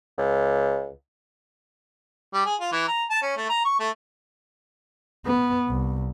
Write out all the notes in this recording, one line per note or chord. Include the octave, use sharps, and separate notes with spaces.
C#2
G3
G#4
F4
E3
A#5
A5
C#4
A3
A#5
C#6
A3
B3
C2